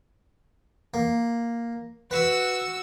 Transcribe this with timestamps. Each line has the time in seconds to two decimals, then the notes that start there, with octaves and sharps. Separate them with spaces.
0.94 A#3
2.11 F#4 B4 E6